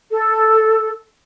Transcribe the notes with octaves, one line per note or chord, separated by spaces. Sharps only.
A4